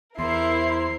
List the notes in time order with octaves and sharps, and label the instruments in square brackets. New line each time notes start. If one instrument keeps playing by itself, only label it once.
[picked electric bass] E2 [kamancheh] E4 [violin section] A#4 C5 C7 [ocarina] C6